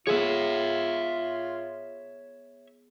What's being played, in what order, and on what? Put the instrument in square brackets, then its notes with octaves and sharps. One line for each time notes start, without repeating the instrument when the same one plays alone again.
[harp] B3 G#4 [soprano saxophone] F4 [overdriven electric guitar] C#5 E5